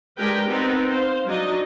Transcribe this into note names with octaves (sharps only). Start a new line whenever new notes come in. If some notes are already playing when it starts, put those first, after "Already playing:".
G#3 D4 G4 A#4 B4 G5
B3 C4 D#4 A#4 B4
C5 F5
F#3 D4 D#4 D#5